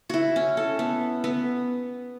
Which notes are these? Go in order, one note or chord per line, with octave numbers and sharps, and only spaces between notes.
E4 F#4
C#4
A4
B3
B3